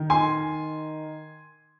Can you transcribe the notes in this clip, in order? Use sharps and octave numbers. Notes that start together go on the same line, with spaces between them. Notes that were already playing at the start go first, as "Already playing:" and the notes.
Already playing: D#3
G#5 C6